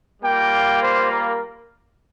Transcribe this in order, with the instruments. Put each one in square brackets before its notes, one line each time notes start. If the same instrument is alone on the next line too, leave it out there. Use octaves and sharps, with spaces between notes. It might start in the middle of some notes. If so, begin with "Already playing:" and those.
[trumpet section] G3 A#3 F4 G5
C5
A#4